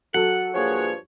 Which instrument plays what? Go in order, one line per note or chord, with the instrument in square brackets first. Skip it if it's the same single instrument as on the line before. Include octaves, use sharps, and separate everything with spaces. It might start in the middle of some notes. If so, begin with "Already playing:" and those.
[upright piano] F#3 [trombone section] A4 [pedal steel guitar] F#5
[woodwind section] G2 F3 C#5 [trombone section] A#3 G#4